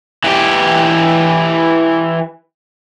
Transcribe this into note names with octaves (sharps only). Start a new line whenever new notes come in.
E3 G4